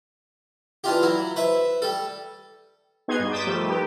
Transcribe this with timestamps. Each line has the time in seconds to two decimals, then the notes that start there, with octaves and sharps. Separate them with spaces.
0.84 E3 D4 F4 G4
1.03 F#3 E4
1.36 B4 C5 E5
1.82 G3 A4
3.08 B3 D#4 F#4 G#4 C6 G#6
3.19 G2
3.31 D6 D#6 G6 A6 B6 E7
3.47 D#3 F3 G3 A3
3.69 D#4 G4 B4